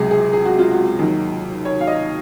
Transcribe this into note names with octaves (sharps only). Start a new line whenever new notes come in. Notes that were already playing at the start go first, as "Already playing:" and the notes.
Already playing: C#2 C3 F#3 G#4
G#4
G#4
F#4
F4
F#4
D#2 D#3 F#3
C#5
F5
D#5